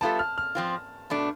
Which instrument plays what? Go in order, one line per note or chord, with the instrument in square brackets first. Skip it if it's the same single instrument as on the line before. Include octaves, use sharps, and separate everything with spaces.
[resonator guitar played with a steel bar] G3 B3 F4 A4 E5 [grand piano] A5
[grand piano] F6
F6
[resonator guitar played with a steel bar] F3 C4 F4
B2 A3 D4